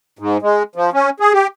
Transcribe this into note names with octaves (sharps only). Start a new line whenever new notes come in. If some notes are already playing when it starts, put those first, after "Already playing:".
G#2
G#3
F3
C#4
G#4
G4